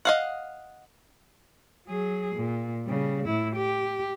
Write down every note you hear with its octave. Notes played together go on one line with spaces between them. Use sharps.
D#5 F5 F#5
F#3 G#4
A#2
C#3 G3
A2 E4
G4